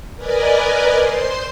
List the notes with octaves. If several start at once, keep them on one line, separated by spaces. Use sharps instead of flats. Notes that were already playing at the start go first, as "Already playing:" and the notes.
A#4 B4 D5 D#5 G#5
C5 C6